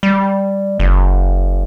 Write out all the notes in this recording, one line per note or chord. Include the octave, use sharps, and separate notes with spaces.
G3
F#1